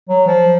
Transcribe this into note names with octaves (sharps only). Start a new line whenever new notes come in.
F#3
F3